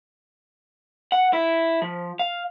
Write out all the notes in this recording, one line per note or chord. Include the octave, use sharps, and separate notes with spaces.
F#5
E4
F3
F5